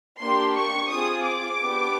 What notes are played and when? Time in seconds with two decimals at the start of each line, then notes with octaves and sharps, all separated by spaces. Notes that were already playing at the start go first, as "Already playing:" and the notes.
0.21 A#3 D4 G4 C6
0.56 C#6
0.91 C4 F4 G#4 D#6
1.25 D6
1.60 B3 D4 G4